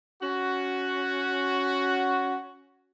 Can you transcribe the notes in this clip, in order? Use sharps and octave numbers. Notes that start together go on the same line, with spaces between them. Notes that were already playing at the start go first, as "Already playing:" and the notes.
C#4 F#4